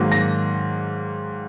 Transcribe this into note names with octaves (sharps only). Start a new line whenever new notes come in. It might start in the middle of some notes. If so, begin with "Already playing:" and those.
Already playing: G#2 D#3 F#3 A#3
A#6